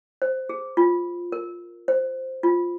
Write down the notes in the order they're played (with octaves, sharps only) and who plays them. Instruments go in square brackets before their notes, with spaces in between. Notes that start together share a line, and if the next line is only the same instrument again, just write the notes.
[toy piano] C5
G#4
F4
A#4
C5
F4